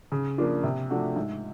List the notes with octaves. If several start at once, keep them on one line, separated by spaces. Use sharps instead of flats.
C#3
F3 A#3 D4 F4
C3
F3 A3 D4 F#4
G#2